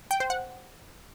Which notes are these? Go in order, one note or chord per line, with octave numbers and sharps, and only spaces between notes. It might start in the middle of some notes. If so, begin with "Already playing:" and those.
G5
C5
F#5